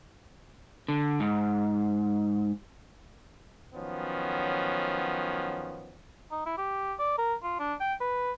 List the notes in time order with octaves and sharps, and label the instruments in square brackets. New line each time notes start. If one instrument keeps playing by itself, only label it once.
[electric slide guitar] D3
G#2
[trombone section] D#3 F3 F#3 B3 C#4
[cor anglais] D#4
E4
G4
D5
A#4
F4
D4
G5
B4